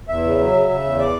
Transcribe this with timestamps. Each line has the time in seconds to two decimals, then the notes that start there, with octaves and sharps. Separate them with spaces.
0.08 E2 E5
0.23 C#3
0.38 F#3
0.53 C#3
0.69 C#3
0.83 E2
0.98 E3 D5